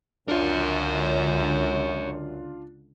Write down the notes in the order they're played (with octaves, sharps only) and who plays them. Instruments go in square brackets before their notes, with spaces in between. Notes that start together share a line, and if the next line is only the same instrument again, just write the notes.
[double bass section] C#2 D3 [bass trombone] F#2 [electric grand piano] D4 F4 [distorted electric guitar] A#4 C#5